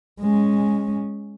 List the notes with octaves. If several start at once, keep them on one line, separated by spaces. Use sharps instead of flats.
G#3 C#4